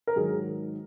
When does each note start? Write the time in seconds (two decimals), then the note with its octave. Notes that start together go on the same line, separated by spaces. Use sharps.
0.07 A#4
0.16 G#2 D#3 F#3 G#4